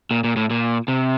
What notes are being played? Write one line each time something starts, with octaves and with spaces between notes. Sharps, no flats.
A#2
A#2
A2
A#2
C3